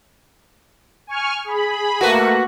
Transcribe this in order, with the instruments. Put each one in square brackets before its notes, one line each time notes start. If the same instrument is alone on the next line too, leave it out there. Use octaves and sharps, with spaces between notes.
[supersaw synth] G#5 C#6 F6
G#4 B5
[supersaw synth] A3 A#3 F#5 [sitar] F#4 B4